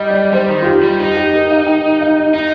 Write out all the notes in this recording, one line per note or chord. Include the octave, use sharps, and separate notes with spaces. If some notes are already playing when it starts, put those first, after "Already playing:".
Already playing: G3 D#5
D5
G3 C5
D#3
F4
G4
G3
D#4 G4
G4
A#4
F5
G5
F5
D#4 D#5